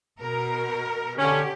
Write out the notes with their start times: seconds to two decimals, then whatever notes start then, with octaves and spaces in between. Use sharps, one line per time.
0.20 B2 A#4
1.19 D3 C#4 G4